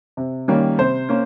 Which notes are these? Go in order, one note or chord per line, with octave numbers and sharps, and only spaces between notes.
C3
D#3 G3 A#3 C#4
C3 C5
A#3 C#4